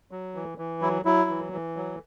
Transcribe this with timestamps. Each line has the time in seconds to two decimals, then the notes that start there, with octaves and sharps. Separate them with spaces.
0.11 F#3
0.35 E3
0.58 E3
0.82 F#3 E4
1.05 F#3 E4
1.30 E3
1.53 E3
1.76 F#3